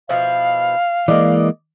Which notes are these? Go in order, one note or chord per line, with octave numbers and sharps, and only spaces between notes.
B2 F3 E4 F5
E3 G#3 A#3 D5 D#5